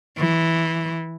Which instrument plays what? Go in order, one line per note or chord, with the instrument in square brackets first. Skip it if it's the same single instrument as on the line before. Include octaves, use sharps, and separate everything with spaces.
[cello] E3